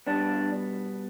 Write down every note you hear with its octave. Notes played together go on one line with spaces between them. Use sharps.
B2 G3 B3 D4